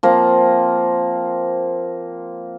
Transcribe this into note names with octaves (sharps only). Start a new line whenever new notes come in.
F3 A#3 C4